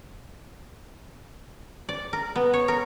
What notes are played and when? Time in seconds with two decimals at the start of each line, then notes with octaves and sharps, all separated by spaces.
1.89 D5
2.13 A#4
2.36 B3
2.54 C#5
2.68 A#4